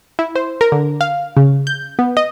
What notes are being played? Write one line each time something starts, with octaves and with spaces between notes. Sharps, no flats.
E4
C5
A#4
D3
F5
C#3
G6
B3
D#5